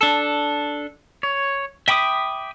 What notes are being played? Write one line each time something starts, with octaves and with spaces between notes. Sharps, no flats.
D4 A4
C#5
E5 G5 B5 D6 D#6